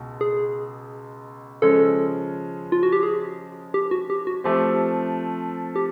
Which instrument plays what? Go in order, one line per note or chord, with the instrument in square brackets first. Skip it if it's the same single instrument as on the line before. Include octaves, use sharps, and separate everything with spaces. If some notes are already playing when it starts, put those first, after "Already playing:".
Already playing: [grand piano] C#2 B2
[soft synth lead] G#4
[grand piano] C#3 F3 G#3 C#4 [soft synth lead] A4
[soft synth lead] F4
F#4
G4
G#4
G4
F#4
G4
F#4
[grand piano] F3 A3 C4 [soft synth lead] G4
[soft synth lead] G4